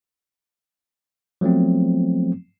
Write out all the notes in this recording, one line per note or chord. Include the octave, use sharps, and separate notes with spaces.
F3 F#3 A3 B3 C4